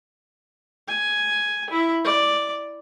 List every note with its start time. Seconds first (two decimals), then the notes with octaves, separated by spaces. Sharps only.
0.88 G#5
1.70 E4
2.04 D5